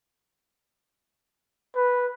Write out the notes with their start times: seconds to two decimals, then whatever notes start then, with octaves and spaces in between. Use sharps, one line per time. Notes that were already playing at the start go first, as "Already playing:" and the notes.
1.76 B4